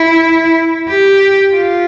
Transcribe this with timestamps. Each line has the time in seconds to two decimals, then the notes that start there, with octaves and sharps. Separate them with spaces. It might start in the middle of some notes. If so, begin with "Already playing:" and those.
Already playing: E4
0.88 G4
1.55 F4